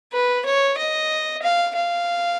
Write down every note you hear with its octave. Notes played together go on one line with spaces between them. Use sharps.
B4
C#5
D#5
F5
F5